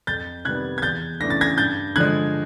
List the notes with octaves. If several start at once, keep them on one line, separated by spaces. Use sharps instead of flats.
F2 G6 A6
C3 D#3 G3 B3 F#6 G#6
G#6
E2 G6 A6
C#3 E3 A3 D4 A#6
A6
G#6 A#6
G2 G6 A6
D3 F3 G#3 F#6 G#6